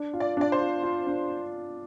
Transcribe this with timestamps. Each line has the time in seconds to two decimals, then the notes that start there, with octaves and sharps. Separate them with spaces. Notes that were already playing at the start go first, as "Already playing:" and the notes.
Already playing: D4
0.13 F4
0.20 D5
0.37 D4 D5
0.52 C5
0.60 F4
0.83 F4
1.07 D4